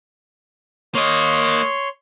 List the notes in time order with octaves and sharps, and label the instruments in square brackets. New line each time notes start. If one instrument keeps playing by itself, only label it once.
[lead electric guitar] A#3 D#5 [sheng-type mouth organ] C#5 C6